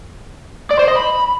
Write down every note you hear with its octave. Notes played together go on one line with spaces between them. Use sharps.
D5
C5
D#5
B5